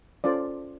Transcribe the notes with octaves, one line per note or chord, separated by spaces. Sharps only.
C#4 F4 A4 C5 D5